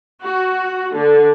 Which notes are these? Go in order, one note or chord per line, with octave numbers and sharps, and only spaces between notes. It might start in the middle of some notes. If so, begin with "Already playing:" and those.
F#4
D3